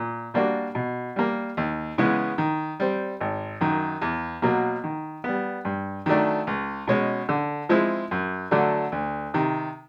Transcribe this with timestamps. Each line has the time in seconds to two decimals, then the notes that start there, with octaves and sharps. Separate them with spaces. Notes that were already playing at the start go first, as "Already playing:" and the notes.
Already playing: A#2
0.34 G3 A#3 D4 F#4
0.75 B2
1.16 G3 A#3
1.57 D#2
1.98 C#3 E3 G#3 B3
2.38 D#3
2.80 G3 C4
3.21 G#1
3.61 F#2 D#3
4.02 E2
4.42 B2 F#3 A#3
4.84 D#3
5.24 G3 B3
5.65 G2
6.06 D#3 F#3 A3 D4
6.47 C#2
6.88 B2 G#3 C#4
7.29 D3
7.69 F3 G#3 C4 E4
8.11 F#2
8.51 D3 F#3 A3 D4
8.92 D2
9.34 C3 D#3